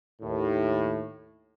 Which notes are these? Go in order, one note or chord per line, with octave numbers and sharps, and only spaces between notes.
D#2 A2